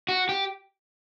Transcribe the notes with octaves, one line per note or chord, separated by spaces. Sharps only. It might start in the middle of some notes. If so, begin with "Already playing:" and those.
F#4
G4